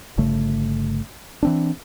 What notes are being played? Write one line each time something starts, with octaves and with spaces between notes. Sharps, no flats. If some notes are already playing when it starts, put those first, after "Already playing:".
G1 C#3 A3
E3 C4 D4